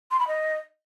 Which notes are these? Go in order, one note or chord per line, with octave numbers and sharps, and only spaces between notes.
C6
B5
D#5